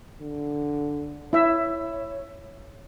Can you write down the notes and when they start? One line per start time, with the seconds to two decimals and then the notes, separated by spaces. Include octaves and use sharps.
0.21 D3
1.33 E4 C#5 E5